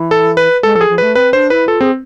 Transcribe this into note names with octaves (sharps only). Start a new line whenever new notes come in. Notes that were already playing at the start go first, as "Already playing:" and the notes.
Already playing: E3
A4
B4
G#3 A4
F3 A4
G#4
F3
A3 B4
C4 B4
D4 C5
E4 B4
F4 A4
C4 G#4